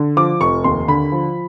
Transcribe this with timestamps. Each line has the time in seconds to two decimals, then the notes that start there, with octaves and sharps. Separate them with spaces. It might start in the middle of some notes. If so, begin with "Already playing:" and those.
Already playing: D3
0.17 F3 D6
0.41 F1 C#6
0.64 D#2 C6
0.88 D3 B5
1.12 F3